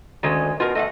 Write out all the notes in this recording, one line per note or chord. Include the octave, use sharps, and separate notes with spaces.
D2 D#3 G#3 C#4
B2 F4 A#4
A3 D#5 E5 F#5